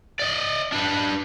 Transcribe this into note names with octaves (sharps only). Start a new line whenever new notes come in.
D5 D#5
D4 B4